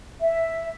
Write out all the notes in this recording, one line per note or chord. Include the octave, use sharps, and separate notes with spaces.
E5